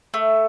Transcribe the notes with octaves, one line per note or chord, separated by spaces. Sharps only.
A3